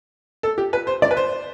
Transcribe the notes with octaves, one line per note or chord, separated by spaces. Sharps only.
A4
G4
B4
C5
D5
B4
C5